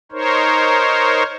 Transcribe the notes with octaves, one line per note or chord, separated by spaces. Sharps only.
D#4 A#4 C5 C#5